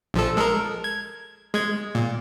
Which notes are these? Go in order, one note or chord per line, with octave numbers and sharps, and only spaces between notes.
A#1 F3 A4
G#3 A4 A#4
G#6
G#3 G#6
A#2